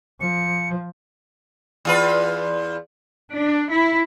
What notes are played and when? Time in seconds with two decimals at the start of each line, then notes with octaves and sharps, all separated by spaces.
0.21 F3 C#7
1.85 E2 F4 B4
3.32 D4
3.70 E4